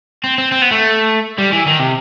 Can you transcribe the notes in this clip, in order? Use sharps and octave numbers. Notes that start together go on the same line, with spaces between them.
C4
C4
C4
B3
A3
G3
E3
D#3
C3